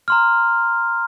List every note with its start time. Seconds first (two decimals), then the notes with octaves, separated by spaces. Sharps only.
0.08 A#5 C6 F6